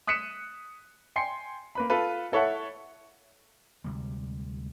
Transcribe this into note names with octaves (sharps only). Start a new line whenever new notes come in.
D#6 F#6 B6 C#7 D#7 E7
G5 G#5 C6 C7 C#7
A#3 B4 B5
F4 A4 B4
E4 A4 C#5 E5 F#5 A5
D2 C3 G3 G#3